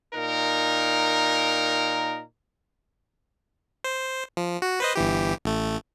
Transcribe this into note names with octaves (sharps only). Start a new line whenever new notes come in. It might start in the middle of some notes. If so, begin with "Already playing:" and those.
A#2 D#4 A#4
C5
F3
F#4
B4 C5 D#5
G1 E3 G4
A1 A3